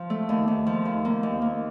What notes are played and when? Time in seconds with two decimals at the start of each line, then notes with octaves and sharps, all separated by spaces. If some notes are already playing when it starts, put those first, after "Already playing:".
Already playing: F3
0.10 A3
0.29 D#2
0.48 D#2
0.67 F3
0.85 D#2
1.05 A#3
1.23 D#2
1.42 A#3